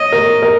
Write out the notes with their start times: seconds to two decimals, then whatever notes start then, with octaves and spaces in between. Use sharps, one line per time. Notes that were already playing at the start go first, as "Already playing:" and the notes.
Already playing: C#5 D#5
0.12 A#4
0.42 A#4